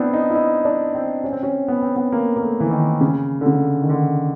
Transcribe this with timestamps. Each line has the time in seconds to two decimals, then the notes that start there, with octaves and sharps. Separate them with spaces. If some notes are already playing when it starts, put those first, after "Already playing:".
Already playing: B3 C4 D4 E4
0.13 D#4
0.30 E4
0.35 D#4
0.65 D4
0.95 C4
1.24 C#4
1.33 C4
1.43 C#4
1.68 B3
1.82 C4
1.96 B3
2.12 A#3
2.37 A#3
2.42 A3
2.60 E3
2.71 D#3
3.01 C#3
3.41 D3
3.46 C#3
3.82 D#3
3.89 D3